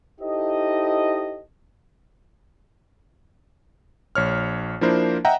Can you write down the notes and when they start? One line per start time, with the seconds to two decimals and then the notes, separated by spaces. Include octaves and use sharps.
0.21 D#4 E4 G4 A4 C5 D#5
4.15 A#1 C#5 F6
4.81 F3 A#3 D4 E4 A#4 C5
5.25 D#5 E5 F#5 G5 A#5